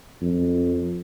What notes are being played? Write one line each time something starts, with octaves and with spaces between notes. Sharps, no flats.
F2